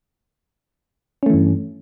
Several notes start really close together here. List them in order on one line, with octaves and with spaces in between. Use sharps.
C#4 A3 E3 G2